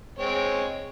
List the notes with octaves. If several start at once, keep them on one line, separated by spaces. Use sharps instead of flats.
G#3 C4 C#5